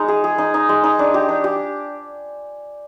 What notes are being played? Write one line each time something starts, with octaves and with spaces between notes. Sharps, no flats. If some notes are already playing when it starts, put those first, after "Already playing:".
Already playing: G#3 D#4
G#4
G#4
D#4
D#4
G#3
D#4
D4
G4
D4
G4